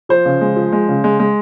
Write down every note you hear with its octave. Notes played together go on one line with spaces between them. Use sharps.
F3 C5
C#3
G#3
F3
G#3
C#3
G#3
G#3